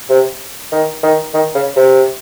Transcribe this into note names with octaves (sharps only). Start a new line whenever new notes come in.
C3
D#3
D#3
D#3
C#3
C3